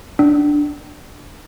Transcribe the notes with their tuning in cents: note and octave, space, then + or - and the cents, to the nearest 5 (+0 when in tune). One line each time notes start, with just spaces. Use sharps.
D4 +0 G5 -40